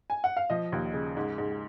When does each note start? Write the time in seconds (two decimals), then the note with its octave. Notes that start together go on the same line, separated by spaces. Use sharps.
0.10 G#5
0.24 F#5
0.36 F5
0.50 F3 D#5
0.72 D#2
0.94 C#3
1.17 G#2
1.38 G#2